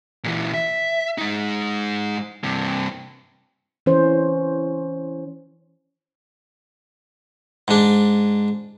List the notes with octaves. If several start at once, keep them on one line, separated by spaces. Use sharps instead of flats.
A#2 E3
E5
G#3 D#4
G2 C3
E3 C#4 C5
G#2 D4